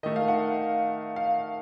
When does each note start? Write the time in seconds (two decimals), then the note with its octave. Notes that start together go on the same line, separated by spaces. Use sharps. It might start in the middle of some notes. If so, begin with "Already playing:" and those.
0.03 D#3 A3 D#4 D#5
0.16 F5
0.28 F#5
1.16 F5